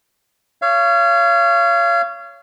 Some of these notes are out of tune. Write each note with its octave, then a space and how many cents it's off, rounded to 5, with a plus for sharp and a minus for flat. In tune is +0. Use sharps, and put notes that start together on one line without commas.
C#5 +15 F5 -30